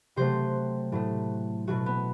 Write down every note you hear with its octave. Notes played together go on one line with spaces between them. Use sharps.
C3 F#3 A3 C5
A2 F#3 A3
B2 F#3 A3 F#4
B3